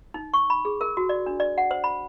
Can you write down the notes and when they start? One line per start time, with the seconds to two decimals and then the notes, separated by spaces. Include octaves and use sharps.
0.14 D#4
0.34 C#6
0.50 B5
0.65 G#4
0.81 A#4
0.97 F#4
1.09 D5
1.26 D4
1.40 D5
1.58 F#5
1.71 C5
1.84 B5